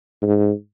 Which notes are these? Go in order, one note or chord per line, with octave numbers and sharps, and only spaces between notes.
G#2